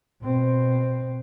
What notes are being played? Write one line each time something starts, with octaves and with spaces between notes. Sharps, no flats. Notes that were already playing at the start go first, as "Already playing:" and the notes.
B2 C4